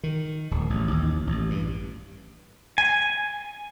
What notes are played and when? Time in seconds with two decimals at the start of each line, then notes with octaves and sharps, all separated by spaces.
0.03 D#3
0.51 D1
0.70 A1
0.91 D#2
1.27 A1
1.50 G2
2.78 G#5